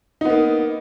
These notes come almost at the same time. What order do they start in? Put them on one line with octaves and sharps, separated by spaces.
D#4 B3 A#3